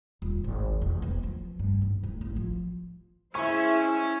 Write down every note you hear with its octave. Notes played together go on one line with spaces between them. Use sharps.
D#1
G#1
E1
B3
F3
G2
G#2
D1
A1
F3
G#3 C#4 E4 C5 E5 C#6